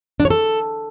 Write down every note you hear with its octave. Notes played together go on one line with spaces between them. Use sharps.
D4
C#5
A4